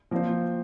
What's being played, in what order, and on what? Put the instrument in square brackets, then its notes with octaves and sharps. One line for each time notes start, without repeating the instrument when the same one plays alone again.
[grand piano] F3 C4 F4 C5 [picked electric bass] A#3